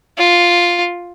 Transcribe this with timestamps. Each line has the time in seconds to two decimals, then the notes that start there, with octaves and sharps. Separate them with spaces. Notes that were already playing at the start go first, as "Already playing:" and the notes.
0.18 F4